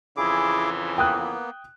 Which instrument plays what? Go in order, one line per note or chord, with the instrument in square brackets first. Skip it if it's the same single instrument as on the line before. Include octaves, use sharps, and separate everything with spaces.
[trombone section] F2 C#3 E3 [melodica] E4 G#4 D6
[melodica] A#3 B3 [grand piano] G5 D#6 F#6